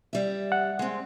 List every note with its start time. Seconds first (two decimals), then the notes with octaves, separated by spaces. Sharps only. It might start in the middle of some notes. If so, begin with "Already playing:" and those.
0.13 G3 E5
0.52 F#5
0.79 G#3 C4